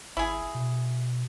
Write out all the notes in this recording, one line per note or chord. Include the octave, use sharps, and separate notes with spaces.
G#1 E4 G#4
B2